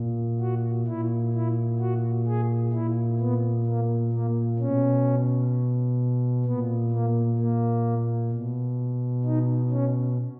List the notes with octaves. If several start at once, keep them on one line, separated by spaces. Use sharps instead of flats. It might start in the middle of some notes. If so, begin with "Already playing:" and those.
Already playing: A#2
F#4
A#2 E4
E4
F#4
G#4
A#2 E4
B3
A#3
A#3
B2 C#4
A#2 B3
A#3
A#3
B2
D#4
C#4